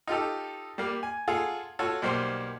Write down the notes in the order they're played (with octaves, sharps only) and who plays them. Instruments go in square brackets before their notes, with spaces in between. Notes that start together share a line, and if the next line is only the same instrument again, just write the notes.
[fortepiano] D#4 F4 G4 A4
G3 A#3
G#5
F4 G#4 A4 F5 F#5
F4 F#4 A4 C#5
B1 G3 A#3 C5 C6